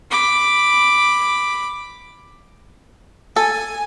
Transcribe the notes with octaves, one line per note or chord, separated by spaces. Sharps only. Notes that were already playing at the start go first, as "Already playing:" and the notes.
B5 D6
A4 G#5